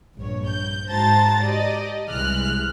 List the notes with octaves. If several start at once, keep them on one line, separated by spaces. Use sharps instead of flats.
A#1 G2 C#5
G6
G#2 F#4 C5 A5 A#5 A6
G4 D5 D#5
C2 E3 G#3 F6 F#6